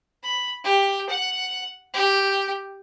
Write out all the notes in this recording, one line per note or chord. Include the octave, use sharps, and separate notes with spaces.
B5
G4
F#5
G4